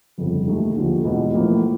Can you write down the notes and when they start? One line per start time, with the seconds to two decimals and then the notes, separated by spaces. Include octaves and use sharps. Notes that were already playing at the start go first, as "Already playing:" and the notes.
0.18 G1 F2 C#3
0.47 D#2 C#3 E3 A3
0.76 D#2 D3 F3
1.05 E1 E2 B2
1.34 A2 F3 A#3